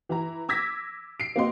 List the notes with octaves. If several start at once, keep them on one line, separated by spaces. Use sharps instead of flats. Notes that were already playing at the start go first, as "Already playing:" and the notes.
E3 E4 A#5
D6 E6 G#6 A#6 B6
C7 D7
A#3 C4 F#4 D#5 C6